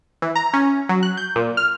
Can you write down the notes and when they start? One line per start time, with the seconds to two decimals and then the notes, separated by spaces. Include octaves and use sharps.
0.22 E3
0.35 A#5
0.53 C#4
0.89 F#3
1.03 F#6
1.17 G6
1.36 A#2
1.57 F6